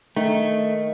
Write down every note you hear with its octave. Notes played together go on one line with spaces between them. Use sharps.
D#3 A3